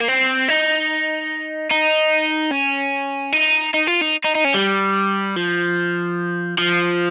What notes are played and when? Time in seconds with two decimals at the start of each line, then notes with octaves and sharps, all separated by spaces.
0.01 A#3
0.08 C4
0.49 D#4
1.71 D#4
2.51 C#4
3.33 D#4
3.74 D#4
3.87 F4
4.01 D#4
4.24 D#4
4.35 D#4
4.44 C#4
4.54 G3
5.36 F3
6.58 F3